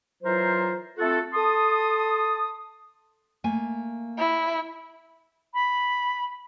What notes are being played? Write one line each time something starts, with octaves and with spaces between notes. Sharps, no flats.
E3 F#3 F4 A#4 C5
A3 C4 F4 F#4 A4
A4 A5 C6 D#6
A3 A#3 G#5
E4
B5